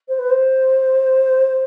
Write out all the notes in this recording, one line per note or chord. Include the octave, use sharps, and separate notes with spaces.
C5
B4
C5